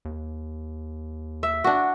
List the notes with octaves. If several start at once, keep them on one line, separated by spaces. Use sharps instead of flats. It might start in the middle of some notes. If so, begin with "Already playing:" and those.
D#2
E5
D4 F#4